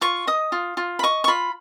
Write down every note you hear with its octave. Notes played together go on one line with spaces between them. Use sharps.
F4 C#6
D#5 D#6
F4
F4
B5
D#5 C#6
C#6
F4 B5